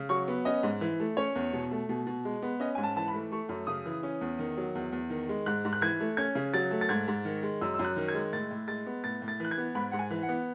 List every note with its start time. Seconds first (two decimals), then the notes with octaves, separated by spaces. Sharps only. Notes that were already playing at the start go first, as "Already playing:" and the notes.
Already playing: C#3
0.09 F#3 C#6
0.28 B3
0.45 C#4 D#5
0.63 G#2
0.81 E3
1.00 A3
1.17 C#4 C#5
1.35 E2
1.53 B2
1.71 A3
1.89 B2
2.07 B2
2.25 G#3
2.42 B3
2.60 C#4 D#5
2.75 G#2 G#5
2.83 A5
2.96 E3 A5
3.08 B5
3.13 A3
3.32 A3 C#6
3.49 F#2
3.67 C#3 D#6
3.86 E3
4.03 C#4
4.21 E2
4.39 D#3
4.57 F#3
4.75 E2
4.92 E2
5.10 D#3
5.29 G#3
5.46 G#2 F#6
5.65 G#2
5.73 F#6
5.81 E3 G#6
6.00 A3
6.17 C#4 G#6
6.35 C#3
6.54 F#3 A6
6.71 A3
6.81 A6
6.89 G#2 G#6
7.08 G#2
7.25 D#3
7.43 G#3
7.61 F#2 E6
7.74 E6
7.79 F#2
7.85 F#6
7.96 D#3
8.08 G#6
8.14 G#3
8.33 A2 A6
8.51 A2
8.67 G#3 A6
8.87 B3
9.04 A2 A6
9.22 A2
9.28 A6
9.40 E3 F#6
9.51 G#6
9.58 B3
9.75 G#2 B5
9.91 G#2 F#5
9.99 G#5
10.11 E3
10.23 F#5
10.29 B3